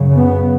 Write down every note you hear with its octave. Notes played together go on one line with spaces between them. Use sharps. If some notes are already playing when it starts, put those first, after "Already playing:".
Already playing: F#2 C#3
B3